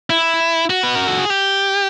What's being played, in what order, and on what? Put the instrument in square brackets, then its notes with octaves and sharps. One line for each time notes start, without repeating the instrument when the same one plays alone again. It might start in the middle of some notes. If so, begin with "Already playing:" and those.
[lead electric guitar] E4
F#4
B4
A#4
A4
G#4
G4